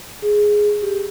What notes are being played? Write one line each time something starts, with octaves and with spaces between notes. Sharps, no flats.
G#4
G4